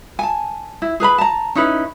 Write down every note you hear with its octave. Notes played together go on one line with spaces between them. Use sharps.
G#5 A5
E4
G#4 B4 A#5 B5
A5 A#5
C#4 D#4 E4 B4